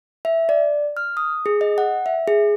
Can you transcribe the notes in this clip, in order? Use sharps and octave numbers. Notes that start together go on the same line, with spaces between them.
E5
D5
F6
D#6
G#4
D#5
F#5
E5
G#4